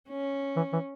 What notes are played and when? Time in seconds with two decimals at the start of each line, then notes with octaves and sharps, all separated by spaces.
0.09 C#4
0.56 E3
0.73 E3